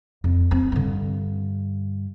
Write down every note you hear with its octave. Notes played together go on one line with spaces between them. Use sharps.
F2
C4
G2 D3